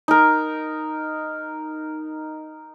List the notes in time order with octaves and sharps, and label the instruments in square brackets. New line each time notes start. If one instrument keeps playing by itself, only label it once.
[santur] D#4 A#4